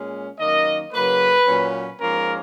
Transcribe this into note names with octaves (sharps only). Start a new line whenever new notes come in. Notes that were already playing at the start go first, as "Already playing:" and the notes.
Already playing: A#2 G#3 C#4
F#2 D#3 A#3 D#5
C#3 F#3 A#3 B4
A#2 F#3 C#4
G#2 F3 A#3 C#4 A#4